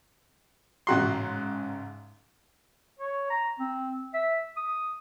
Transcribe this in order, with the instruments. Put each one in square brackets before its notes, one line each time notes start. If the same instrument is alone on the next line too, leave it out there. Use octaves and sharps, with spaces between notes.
[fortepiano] A1 F#4 C6 [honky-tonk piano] G#2 C#3 A#5
[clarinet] C#5
A#5
C4
E5
D#6